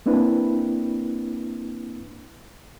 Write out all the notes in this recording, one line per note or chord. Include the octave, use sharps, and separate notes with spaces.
A#3 C4 D4 E4 B4